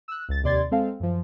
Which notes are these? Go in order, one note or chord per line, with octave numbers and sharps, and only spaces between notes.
E6 F#6
C#2 A6
D#2 C3 D5 C6 G#6 A6
G#3 C4 A4 F5
F#2 F3